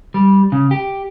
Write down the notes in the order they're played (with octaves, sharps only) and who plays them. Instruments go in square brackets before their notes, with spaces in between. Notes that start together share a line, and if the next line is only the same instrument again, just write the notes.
[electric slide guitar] G3
C#3
G4